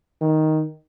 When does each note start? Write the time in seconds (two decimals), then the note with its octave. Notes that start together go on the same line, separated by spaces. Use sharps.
0.21 D#3